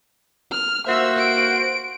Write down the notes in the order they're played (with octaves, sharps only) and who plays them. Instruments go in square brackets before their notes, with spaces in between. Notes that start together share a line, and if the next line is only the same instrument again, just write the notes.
[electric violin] F6
[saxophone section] A#3 F#4 C5 [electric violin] E5 E6
[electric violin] D7